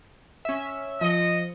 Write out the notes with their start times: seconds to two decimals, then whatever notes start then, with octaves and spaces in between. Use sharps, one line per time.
0.45 C#4 E5
1.01 F3 D#5 C#7